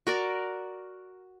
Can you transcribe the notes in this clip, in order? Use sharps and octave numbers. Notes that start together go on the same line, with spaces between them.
F#4 A#4 D5